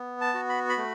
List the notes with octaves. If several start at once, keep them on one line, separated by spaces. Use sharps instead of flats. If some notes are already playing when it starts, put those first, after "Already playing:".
Already playing: B3
A5
F#4
B5
B5
A3